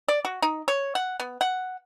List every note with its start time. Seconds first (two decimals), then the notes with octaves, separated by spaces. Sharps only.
0.08 D5
0.25 F#4
0.42 D#4
0.68 C#5
0.95 F#5
1.20 B3
1.41 F#5